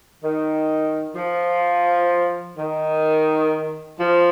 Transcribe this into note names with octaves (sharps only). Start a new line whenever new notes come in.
D#3
F3
D#3
F3